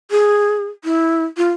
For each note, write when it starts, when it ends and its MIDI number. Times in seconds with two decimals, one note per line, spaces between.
0.11 0.66 68
0.84 1.25 64
1.37 1.51 65